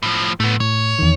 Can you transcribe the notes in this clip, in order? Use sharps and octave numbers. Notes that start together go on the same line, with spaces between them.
A2 F3
A2 A3 B3
A2 C#5
E2 D#3